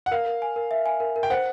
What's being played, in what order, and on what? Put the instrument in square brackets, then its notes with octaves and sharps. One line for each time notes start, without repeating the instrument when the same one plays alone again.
[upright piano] F#5
[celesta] A#4 [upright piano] F5
[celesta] A#4
G#5
A#4
E5
G#5
A#4
A#4
[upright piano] G5
[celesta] C5 [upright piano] F#5